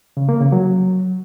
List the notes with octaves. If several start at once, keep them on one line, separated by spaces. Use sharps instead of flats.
C#3
A#3
C#3
F#3